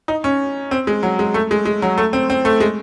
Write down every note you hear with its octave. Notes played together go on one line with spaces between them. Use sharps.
D#4
C#4
C4
G#3
F#3
G#3
A3
G#3
G#3
F#3
A3
C4
C4
A3
G#3